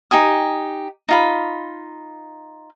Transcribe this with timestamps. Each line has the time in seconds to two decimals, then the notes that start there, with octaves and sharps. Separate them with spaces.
0.11 D#4 G4 G#5 D#6
1.09 D#4 F4 B5